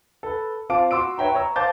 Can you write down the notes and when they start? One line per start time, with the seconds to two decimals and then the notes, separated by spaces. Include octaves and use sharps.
0.23 A4 B4
0.69 C4 F4 F5 A5 D6 D7
0.91 F#4 C6 D6 E6 D7
1.18 B4 C#5 E5 G5 A#5
1.35 C#5 A#5 E6
1.56 C5 F5 A5 D6 G6 A6